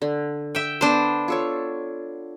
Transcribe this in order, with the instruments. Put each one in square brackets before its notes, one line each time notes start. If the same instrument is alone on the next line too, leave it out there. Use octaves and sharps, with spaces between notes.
[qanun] D3
[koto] E5 G5
[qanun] B3 [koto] D4 C5
[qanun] F4 A4 C#5